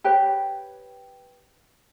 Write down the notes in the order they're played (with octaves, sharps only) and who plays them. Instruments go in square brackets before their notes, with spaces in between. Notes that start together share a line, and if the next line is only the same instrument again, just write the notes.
[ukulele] G4 B4 C#5 G5